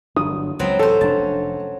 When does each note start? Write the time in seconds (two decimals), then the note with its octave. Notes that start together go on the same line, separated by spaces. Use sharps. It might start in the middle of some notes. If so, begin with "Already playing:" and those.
0.16 G1 F#3 D4 D#6
0.59 C#2 F#3 B3 C4
0.79 A2 C#4 A4 C5
1.01 F1 B2 D4 A5